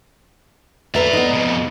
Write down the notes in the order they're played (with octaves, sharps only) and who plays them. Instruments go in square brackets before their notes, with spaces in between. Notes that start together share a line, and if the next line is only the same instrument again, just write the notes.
[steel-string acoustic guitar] A4 B4 E5 [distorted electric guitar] D5 A#5
[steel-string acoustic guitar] B3 D#4
[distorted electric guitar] F2 B2